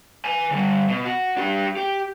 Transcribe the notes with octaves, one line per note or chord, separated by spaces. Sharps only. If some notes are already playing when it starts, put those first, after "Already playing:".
B4 G#5
D3 G3
B2
F#4
D4 G4
G4